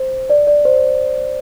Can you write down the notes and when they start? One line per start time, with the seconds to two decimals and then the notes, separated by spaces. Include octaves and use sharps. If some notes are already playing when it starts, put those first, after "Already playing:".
Already playing: C5
0.30 D5
0.47 D5
0.65 C5